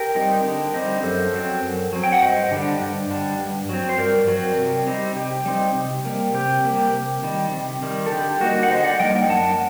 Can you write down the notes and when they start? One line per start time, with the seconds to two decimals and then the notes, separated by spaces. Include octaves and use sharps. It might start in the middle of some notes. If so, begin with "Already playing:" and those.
Already playing: G4 A#4
0.15 G3 C4 D#4
0.45 D3
0.74 G3 C4 D#4
1.03 F#2 A4 C5
1.34 F#3 C4
1.62 F#2
1.93 F#3 C4
2.04 G5
2.12 F#5
2.22 G2 C5 D#5
2.51 D3 G3 D4
2.80 G2
3.10 D3 G3 D4
3.39 G2
3.69 F#3 C4
3.89 C5
3.98 G2 A#4 D5
4.27 F#3 C4
4.58 C3
4.87 G3 C4 D#4
5.16 C3 G4
5.45 G3 C4 D#4
5.75 C3
6.05 G3 A#3
6.34 C3 G4
6.64 G3 A#3
6.94 C3
7.23 D#3 G3
7.52 C3
7.82 D#3 G3
8.06 A4
8.11 D3 G4
8.40 G3 A#3 D#4 F#4
8.63 F#5
8.70 D3 C5 D#5
8.84 D5 F#5
9.00 G3 A#3 D#4 D#5 G5
9.29 F#2 F#5 A5